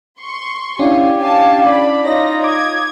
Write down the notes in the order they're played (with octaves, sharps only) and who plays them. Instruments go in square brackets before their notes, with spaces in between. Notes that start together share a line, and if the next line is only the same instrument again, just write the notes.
[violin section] C6 C#6
[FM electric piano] C#4 D4 E4 [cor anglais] G4 [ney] F5 [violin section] G#5
[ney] F5 [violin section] G#5 A5
[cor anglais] D5 [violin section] B5
[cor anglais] D#4 [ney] F4 [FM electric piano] C#5 D#5 [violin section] A#6
[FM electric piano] D6 D#6 [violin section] G#6